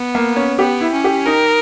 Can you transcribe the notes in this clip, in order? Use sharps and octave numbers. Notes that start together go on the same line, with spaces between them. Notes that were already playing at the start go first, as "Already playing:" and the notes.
Already playing: B3
A#3
C#4
B3 G4
E4
C#4
G4
D#4 A#4